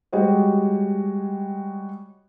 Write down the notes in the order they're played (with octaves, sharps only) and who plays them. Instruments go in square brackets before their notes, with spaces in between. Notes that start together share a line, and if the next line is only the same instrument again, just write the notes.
[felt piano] G3 G#3 F#4 C#5 D#5 G5